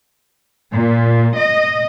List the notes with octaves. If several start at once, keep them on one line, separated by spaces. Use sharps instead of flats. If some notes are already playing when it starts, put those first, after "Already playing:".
A#2
D#5